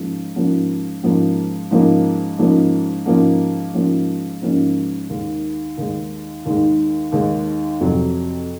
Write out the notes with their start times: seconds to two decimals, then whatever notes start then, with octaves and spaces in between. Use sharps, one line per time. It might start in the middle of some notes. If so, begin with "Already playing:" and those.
Already playing: G#2 F3 A#3 C#4
0.36 G#2 F3 A#3 C#4
1.03 G#2 F3 A#3 C#4
1.71 G#2 F3 A#3 C#4
2.38 G#2 F3 A#3 C#4
3.06 G#2 F3 A#3 C#4
3.73 G#2 F3 A#3 C#4
4.42 G#2 F3 A#3 C#4
5.09 D#2 D#3 G#3
5.77 D#2 D#3 G#3
6.45 D#2 D#3 G#3
7.12 D#2 D#3 G#3
7.80 F2 C3 F#3